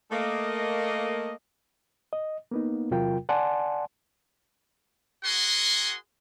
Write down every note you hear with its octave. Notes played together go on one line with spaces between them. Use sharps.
A3 A#3 D#5
D#5
A#3 B3 D#4
E2 C3 F#3 F4 A#4 G5
D5 F#5 G#5 A5 C6
F#4 G#4 A#4 F#5 G#5 C6